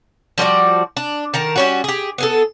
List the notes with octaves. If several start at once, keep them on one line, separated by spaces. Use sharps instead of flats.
F3 G3 F#4 D5
D4
D#3 A#4 A5
G3 C#4 F#4
G4 G#4
B3 G#4 A4